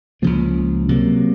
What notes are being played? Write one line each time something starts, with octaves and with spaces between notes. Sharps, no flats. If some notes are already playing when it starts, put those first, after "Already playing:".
C#2 C#3 F3 A#3
C3 F#3 A#3